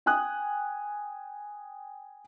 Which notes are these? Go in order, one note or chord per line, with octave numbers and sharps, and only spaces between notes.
G5 G#5 D#6 F#6